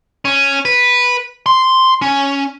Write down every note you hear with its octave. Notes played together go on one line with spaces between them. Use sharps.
C#4
B4
C6
C#4